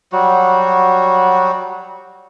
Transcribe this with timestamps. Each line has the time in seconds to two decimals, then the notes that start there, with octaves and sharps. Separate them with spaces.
0.13 F#3 G3 F#4